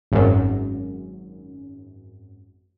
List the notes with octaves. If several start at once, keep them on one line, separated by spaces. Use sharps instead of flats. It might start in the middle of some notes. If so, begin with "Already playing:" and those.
G#1 F#2